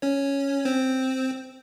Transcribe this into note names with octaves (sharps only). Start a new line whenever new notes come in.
C#4 C#5
C4 C5